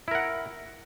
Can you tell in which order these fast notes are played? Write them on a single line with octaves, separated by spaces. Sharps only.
E4 A#4 F#5